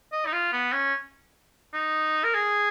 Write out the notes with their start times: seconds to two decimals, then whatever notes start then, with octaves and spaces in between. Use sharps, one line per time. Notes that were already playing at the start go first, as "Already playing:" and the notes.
0.12 D#5
0.26 D#4
0.33 F4
0.53 B3
0.73 C#4
1.73 D#4
2.24 A#4
2.34 G#4